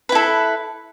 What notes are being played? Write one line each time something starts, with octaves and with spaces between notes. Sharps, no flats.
E4 A4 B4